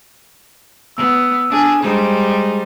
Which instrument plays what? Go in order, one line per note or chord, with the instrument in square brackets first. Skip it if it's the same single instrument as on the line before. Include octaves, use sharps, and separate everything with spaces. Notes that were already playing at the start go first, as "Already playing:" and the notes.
[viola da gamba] B3 [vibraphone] E6
[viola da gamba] D4 G#4
[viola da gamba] G3 D#4 C5 [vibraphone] G#3 G#4